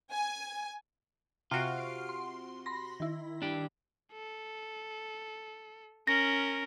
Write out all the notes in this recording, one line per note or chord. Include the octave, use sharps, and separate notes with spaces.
G#5
C3 F4 F#4 F6 C7 D7
C6
B5 C6 A#6
D#3 E4
D4 G4
A4
C#4 A#4 A#6